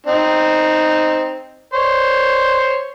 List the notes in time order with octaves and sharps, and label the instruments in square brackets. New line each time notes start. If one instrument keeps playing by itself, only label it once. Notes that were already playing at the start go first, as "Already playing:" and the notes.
[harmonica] C4 D#4
C5 C#5